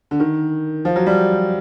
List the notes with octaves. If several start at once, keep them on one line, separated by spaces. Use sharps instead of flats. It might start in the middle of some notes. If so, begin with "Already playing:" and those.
D3
D#3
F3
F#3
G3